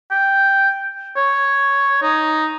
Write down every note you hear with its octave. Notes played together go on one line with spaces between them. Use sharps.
G5
C#5
D#4